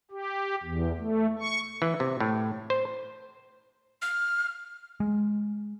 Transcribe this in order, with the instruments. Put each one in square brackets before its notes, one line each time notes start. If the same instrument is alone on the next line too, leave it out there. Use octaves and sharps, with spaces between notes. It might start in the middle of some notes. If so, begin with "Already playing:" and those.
[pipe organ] G4
E2
A3
C#6
[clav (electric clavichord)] E3
C3
A2
C5
[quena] F6
[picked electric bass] G#3